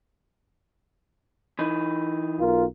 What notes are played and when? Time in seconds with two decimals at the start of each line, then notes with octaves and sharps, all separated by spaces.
1.59 E3 D#4
2.39 B1 F4 A#4